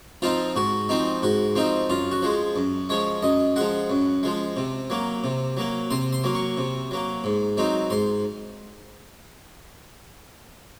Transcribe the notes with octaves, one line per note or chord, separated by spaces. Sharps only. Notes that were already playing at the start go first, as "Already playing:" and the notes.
F3 C4 D#4 F4
G#2 F#4
F3 C4 D#4
G#2 F#4
F3 C4 D#4
F#2 F4
F#4
F3 G#3
F#2
F3 G#3 C#5
F#2 D#5
F3 G#3 F#5
F#2
F3 G#3
C3
F#3 A#3
C3
F#3 A#3
C3 C6
C6
F#3 A#3
C#6
C3
F#3 A#3
G#2
F#3 C4 D#4
G#2 C6